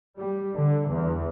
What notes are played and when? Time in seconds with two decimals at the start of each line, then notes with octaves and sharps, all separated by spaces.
0.17 G3
0.56 D3
0.91 E2